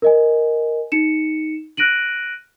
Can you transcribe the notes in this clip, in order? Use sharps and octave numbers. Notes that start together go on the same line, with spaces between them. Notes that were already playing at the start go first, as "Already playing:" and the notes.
A#4 D#5 G#5
D#4 C#7 E7
F6 F#6 A#6 D7 D#7 F#7